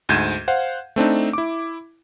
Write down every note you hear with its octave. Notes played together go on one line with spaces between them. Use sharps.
D2 G#2 G6 G#6 D#7 E7
C5 F5 F#5
A3 C4 D4 D#4
E4 D6